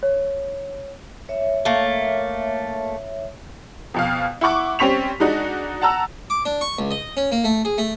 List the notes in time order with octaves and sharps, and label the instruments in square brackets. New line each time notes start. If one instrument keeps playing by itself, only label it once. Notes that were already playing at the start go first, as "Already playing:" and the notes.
[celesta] C#5
[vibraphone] C#5 E5
[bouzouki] A3 A#3
[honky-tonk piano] F2 B2 F5
E4 F#5 C#6 D6
G3 C4 C#4 C#6 B6 F7
G#3 D4 D#4 F#4
F#5 A5 A#5 E6
[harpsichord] D6
D4
C#6
C#2
D#5
C#4
A#3
A3
G#4
A3